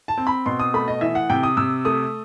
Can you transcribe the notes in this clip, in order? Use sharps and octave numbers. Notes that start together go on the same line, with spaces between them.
A5
C4
B5
B2 C6
D#6
A3 B5
D#5
E3 E5
F#5
C3 G5
D#6
C3 E6
A3 D#6